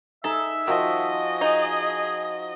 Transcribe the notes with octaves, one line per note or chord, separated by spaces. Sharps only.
D#4 G#4 A4 E5
D#3 F3 F#4 D#5
D#4 G#4